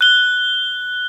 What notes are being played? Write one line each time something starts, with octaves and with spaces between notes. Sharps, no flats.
F#6 G7